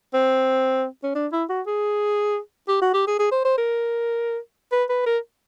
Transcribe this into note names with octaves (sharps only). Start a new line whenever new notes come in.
C4
C#4
D4
E4
F#4
G#4
G4
F#4
G4
G#4
G#4
C5
C5
A#4
B4
B4
A#4